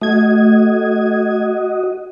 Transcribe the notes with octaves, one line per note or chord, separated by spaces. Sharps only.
A3 F#4 D#5 G#6